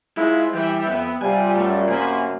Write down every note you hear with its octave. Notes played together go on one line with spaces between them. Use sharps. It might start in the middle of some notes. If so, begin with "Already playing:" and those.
G#2 G#3 E4 F4
E3 G3 E5 G5
F2 B3
C3 G3 F4 D5 G#5
F#2 A3
C3 A#3 C5 G#5 B5